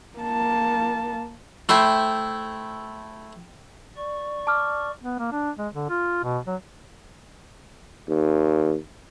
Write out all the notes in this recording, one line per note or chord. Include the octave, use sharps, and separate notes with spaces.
A#3 A5
A3 E4 C5 E5 G5
D5 C#6
A5 D6 F6
B3
A#3
D4
G#3
D3
F4
B2
F#3
D#2